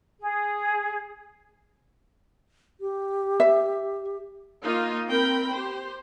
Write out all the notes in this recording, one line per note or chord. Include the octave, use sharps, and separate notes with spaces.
G#4
G4
E5
A#3 D#4 F4
C4 A#4 G5 B5
G4 C5